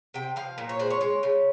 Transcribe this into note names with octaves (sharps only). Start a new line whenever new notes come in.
C3 G5
F3 F5
A#2
C#5
G#3 C5
C#5
G#3 C#5
C#3